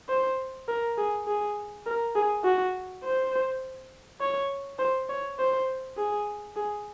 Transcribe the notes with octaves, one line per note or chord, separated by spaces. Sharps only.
C5
A#4
G#4
G#4
A#4
G#4
F#4
C5
C#5
C5
C#5
C5
G#4
G#4